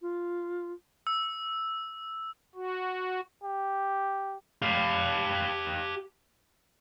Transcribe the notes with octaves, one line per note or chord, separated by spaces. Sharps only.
F4
E6
F#4
G4
G4 F5